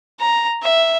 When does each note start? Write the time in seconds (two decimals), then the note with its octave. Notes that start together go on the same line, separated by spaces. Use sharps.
0.20 A#5
0.62 E5